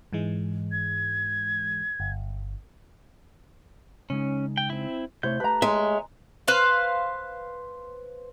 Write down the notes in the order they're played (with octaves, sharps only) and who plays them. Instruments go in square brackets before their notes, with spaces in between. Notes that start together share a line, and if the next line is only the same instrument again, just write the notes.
[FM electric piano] G#2 E3 G#3
[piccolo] G#6
[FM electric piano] G1
[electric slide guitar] C#3 G#3 D#4 [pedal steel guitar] C#4
[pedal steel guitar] G5
C4 E4
[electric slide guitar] C3 A3 E5 [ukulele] E4 C5 C#5 [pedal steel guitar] G6
[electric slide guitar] A3 G4 A5 [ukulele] B4 A#5
[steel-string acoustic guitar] G#3 [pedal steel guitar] C#5 E5
[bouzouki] B4 C5 F5